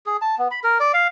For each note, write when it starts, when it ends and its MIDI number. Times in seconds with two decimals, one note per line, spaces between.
0.06 0.17 68
0.22 0.35 81
0.38 0.48 59
0.51 0.60 83
0.64 0.78 70
0.80 0.92 74
0.94 1.07 77